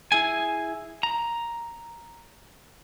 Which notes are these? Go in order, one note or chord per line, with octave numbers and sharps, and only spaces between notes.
E4 G#4 G#5
A#5